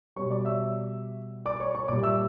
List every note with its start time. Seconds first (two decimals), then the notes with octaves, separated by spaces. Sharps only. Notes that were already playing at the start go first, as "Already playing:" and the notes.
0.16 B2 G3 C#5 C#6
0.30 D5 D6
0.45 E5 E6
1.46 D5 D6
1.60 C#5 C#6
1.75 C#5 C#6
1.88 A#2 G3 D5 D6
2.03 E5 E6